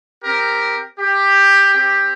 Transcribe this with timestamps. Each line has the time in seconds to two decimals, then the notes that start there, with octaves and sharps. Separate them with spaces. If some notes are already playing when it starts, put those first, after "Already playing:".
0.23 C4 G4 A#4
0.98 G4
1.73 C4 G4